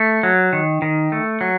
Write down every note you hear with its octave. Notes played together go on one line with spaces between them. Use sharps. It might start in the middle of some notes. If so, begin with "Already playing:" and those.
Already playing: A3
F#3
D#3
D#3
A3
F#3